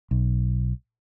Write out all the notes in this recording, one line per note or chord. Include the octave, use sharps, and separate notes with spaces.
B1